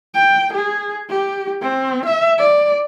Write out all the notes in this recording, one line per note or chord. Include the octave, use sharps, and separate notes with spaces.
G5
G#4
G4
C4
E5
D5